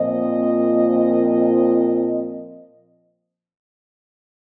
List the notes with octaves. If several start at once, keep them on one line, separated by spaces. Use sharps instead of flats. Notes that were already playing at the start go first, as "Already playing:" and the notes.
Already playing: A#2 F3 C4 D#5